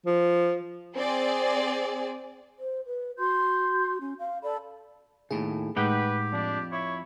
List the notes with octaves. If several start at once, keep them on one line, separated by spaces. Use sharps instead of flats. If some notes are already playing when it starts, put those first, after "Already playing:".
F3
C4 G#4 D5
C5
B4
F#4 C6 G6
C#4
F5
A4 D5 B5
D#2 A2 C#3 G#4
A2 G#3 D#4 G4 B4 F#5 G5
F2 D4
E4 C#5